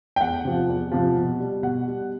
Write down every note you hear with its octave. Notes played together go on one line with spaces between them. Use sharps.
G5
E2 F#5
C3 F3
E2
C3 F3
B2
G3
B2 F#5
G3